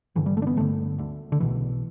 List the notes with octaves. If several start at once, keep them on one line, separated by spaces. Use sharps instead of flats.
G1 G2 D3 E3
G3
A3
D4
B3
G1 G2 D3 A3
D2 D3
D3
B1 B2 E3